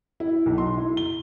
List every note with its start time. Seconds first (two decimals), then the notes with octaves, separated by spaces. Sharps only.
0.20 E4
0.46 B1
0.58 C6
0.78 E4
0.97 G7